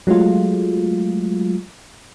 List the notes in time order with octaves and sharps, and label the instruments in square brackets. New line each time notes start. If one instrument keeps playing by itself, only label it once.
[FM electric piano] F#3 G#3 A3 F4